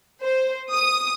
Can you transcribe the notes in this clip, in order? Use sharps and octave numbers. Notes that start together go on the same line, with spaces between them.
C5
D#6